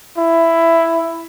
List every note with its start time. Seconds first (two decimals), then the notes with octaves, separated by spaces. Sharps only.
0.17 E4